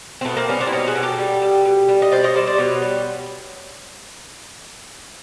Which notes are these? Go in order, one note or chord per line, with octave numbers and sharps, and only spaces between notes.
C4
B2 A3 B3
A#3 C4
G3 B3 C#4
C4 D4
E4
B2 C#4 D#4
F#4 G#4
B2
G4 A4
G3
G3
B2
G3
D#5
B2 C5 D5
C#5 D#5
G3 C5 D5
C5 D5
B2 B4 C#5
G3